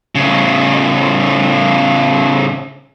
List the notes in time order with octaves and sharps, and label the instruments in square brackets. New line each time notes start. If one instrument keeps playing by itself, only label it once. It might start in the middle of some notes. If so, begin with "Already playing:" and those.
[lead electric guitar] A2 C#3